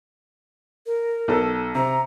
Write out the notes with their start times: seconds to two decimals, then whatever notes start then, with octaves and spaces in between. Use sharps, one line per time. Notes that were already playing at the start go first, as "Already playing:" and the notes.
0.86 A#4
1.28 B1 A4
1.75 C3 A#5